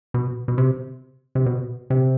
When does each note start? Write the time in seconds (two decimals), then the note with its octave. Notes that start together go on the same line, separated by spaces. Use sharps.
0.14 B2
0.48 B2
0.58 C3
1.35 C3
1.46 B2
1.90 C3